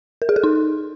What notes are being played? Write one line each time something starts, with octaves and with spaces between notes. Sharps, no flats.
A#4
G#4
A4
D#4